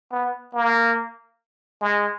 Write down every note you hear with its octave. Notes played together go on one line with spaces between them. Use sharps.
B3
A#3
G#3